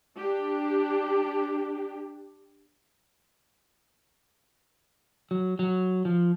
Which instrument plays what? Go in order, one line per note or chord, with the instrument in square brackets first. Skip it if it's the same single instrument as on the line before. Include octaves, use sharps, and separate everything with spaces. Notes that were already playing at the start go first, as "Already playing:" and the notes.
[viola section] D4 G4
[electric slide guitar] F#3
F#3
F3